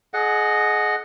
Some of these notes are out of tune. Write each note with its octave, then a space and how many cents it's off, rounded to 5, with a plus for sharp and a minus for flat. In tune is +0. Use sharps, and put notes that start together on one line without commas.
G#4 +35 D#5 -10 F#5 +0